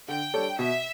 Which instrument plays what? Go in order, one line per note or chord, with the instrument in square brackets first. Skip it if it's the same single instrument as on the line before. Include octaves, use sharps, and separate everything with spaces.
[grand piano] D3 [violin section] G5
[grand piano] G3 D4 A4 C#5
[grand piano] B2 [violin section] E5